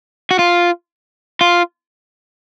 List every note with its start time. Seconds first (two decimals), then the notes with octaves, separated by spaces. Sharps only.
0.31 F#4
0.39 F4
1.41 F4